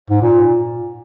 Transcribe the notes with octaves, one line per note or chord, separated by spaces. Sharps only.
G#2
A#2